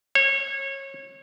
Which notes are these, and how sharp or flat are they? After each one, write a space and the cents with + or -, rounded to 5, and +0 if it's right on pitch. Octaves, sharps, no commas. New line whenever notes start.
C#5 -25